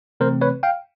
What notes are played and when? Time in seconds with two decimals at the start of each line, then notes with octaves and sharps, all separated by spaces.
0.20 C3 E3 A3 C4 A#4 C5
0.41 B4 C#5
0.63 F5 G5